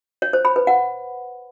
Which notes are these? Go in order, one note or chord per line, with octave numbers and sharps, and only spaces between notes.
C#5
C5
B5
B4
F#5